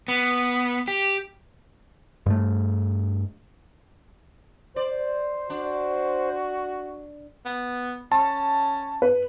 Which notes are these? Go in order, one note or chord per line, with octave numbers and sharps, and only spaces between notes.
B3
G4
G2 A3
C5 D5
D4 F#4
B3
C#4 A5
B4